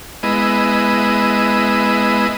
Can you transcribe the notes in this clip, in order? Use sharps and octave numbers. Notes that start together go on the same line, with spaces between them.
G#3 B3 E4 D#5